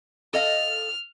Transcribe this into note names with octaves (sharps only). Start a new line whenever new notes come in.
A4 D#5 F5 F6